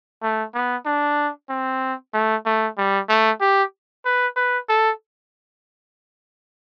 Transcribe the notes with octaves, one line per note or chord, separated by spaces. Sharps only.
A3
B3
D4
C4
A3
A3
G3
A3
G4
B4
B4
A4